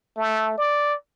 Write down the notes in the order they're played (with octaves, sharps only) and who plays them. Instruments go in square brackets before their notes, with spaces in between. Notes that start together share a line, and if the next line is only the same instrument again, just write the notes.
[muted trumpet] A3
D5